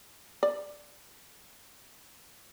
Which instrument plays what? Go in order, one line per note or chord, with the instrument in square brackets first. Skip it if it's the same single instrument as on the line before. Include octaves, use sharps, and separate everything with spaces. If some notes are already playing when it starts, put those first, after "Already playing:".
[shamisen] D5